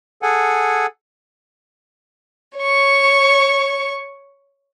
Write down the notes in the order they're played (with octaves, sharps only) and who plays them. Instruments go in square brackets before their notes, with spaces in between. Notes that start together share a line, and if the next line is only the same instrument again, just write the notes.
[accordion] G#4 A4 F#5 G#5
[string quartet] C#5 C#6